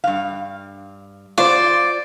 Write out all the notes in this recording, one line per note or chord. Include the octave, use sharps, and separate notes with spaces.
G2 F5
F4 C5 D5